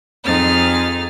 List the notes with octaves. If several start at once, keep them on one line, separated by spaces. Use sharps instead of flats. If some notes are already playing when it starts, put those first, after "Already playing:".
F2 C4 D#4 G#4 F6 A6